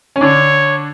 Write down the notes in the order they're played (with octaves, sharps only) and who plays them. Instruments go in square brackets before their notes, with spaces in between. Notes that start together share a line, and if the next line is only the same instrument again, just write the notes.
[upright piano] C#4
[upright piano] D3 D4 [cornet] C#5